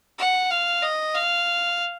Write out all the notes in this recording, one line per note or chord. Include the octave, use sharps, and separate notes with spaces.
F#5
F5
D#5
F5